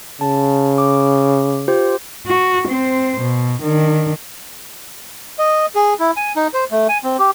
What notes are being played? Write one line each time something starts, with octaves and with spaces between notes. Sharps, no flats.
C#3 A5
D6
F4 G4 C5
F#4
C4 C5
B2
D#3 D4
D#5
G#4
E4
G#5
D#4
C5
A3
G#5
C4
G4